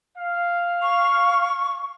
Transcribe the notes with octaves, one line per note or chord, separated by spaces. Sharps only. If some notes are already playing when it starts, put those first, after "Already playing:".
F5
C#6